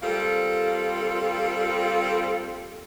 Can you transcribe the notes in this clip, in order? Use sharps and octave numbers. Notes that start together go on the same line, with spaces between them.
G3 A#3 C4 F4 A4